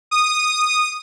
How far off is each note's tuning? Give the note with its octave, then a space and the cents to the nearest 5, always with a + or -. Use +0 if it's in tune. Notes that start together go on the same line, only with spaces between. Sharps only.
D#6 -10